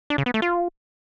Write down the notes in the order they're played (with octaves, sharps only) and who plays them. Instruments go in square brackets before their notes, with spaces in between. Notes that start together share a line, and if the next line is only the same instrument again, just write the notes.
[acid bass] D4
C#3
B3
A3
F4